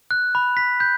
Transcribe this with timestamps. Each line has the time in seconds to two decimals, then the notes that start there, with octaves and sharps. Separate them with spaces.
0.11 F#6
0.35 B5
0.57 B6
0.80 G6